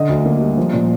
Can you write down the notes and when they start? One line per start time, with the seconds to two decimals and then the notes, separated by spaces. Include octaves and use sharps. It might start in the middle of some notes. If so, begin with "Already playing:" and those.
Already playing: D3 D#5
0.09 D2
0.26 A#3
0.41 G3
0.57 F3
0.73 A#2